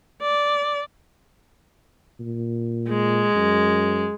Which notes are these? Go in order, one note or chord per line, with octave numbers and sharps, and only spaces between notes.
D5
A#2
G#3
F#2